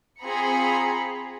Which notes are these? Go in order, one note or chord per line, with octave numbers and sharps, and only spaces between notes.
C4 F4 G#4 A#5 B5 C#7